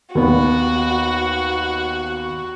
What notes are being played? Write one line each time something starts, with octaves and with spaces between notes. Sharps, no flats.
D#2 B3 F#4